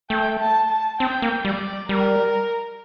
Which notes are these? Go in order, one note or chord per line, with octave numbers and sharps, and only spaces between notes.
A3 G5
A5
A5
C4 G5
A#3
G3 D5
G3 A#4